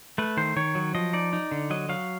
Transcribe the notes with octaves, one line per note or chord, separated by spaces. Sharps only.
A3 B4
D#3 C5
D#3 C#5
F#3
F3 D#5
D#4 D5
D#4
D3
F#3 D#5
F#3 F5